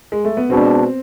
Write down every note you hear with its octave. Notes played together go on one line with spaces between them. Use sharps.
G#3
A3
B3
B2 G#3 C4 D4